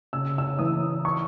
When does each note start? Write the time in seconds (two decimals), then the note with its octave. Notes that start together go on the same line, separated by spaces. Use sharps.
0.13 C#3 E6
0.38 E6
0.59 E3 D#6
1.05 C#6